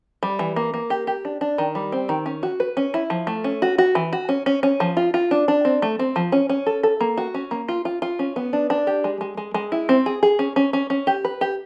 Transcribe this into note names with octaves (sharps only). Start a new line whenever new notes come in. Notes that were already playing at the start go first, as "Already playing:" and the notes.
G3
E3
A#3
A#3
G4
G4
D4
D4
D#3
G3
C4
D#3
C#4
F#4
B4
C#4
E4
F3
A3
C#4
F#4
F#4
E3
F#4
C#4
C#4
C#4
F3
F4
F4
D4
D4
C4
A3
C4
F3
C#4
C#4
A4
A4
A#3
F#4
C#4
A#3
F4
F4
F4
C#4
B3
D4
D4
G4
G#3
G#3
G#3
G#3
E4
C4
G#4
G#4
C#4
C#4
C#4
C#4
G4
B4
G4